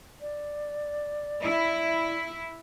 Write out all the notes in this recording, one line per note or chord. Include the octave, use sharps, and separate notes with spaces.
D5
E4